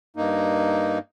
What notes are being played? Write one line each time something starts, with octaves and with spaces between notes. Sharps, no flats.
G2 A#3 D#4